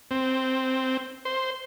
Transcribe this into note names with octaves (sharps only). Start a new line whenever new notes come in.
C4
C5